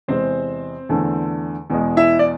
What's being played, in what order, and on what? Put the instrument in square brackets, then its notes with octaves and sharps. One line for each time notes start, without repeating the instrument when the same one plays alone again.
[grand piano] E2 C3 G#3 C4 C5
E2 D3 A3
E2 B2 G#3
E4 E5
D5